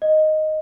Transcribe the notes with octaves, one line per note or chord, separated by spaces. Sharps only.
D#5